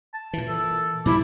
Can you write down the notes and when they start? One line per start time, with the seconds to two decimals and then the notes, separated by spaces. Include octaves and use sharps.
0.14 A5
0.33 A#2 E3
0.48 A4
1.06 A#2 F3 G3 E4 D6